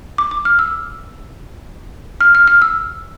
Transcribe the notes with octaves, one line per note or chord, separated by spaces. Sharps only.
D6
D6
F6
E6
F6
F6
F6
E6